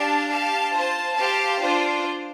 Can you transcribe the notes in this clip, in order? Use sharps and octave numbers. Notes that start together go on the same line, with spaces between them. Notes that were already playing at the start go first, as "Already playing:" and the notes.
Already playing: D4 G4 F5 A5
G4 F5 A5
F4 C5 A5
G4 C5 F5 A5
D4 F4 C5